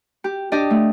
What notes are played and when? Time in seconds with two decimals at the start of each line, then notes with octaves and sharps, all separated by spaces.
0.24 G4
0.52 D4 G4 D5 D#5
0.70 A3